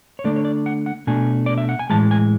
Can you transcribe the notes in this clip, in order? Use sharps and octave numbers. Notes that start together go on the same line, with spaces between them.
C#5
D3 A3 D4 D5
C#5
D5
F#5
F#5
B2 A3 D4 G#5
D5
E5
F#5
G#5
A2 E3 G#3 A5
G#5